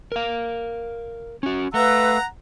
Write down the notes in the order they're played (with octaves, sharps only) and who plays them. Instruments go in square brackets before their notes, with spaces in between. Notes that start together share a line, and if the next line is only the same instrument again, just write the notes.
[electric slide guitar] A#4 F5
C#4 F#4
[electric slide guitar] A3 [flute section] B4 F5 E6 [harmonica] F#5 A#5